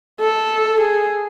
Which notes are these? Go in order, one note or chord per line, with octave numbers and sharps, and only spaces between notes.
A4
G#4